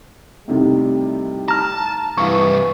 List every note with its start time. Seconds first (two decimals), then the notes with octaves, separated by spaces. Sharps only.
0.48 A2 C3 D#3 G3
1.48 A5 A#5 F6
2.18 C2 G2 E3 F5 C#6